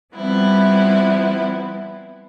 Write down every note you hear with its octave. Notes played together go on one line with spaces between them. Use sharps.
F3 G3 B3 C4 E4